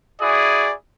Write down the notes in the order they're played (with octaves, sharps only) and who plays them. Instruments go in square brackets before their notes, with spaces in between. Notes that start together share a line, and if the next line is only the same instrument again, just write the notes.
[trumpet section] E4 F#4 G#4 [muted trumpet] D5